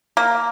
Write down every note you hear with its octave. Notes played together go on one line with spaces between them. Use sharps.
A#3